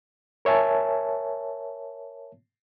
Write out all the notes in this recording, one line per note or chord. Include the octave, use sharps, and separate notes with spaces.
A#4 C#5 E5 G#5 A5